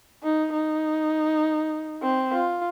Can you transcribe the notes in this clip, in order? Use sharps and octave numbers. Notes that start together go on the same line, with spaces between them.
D#4
D#4
C4
F4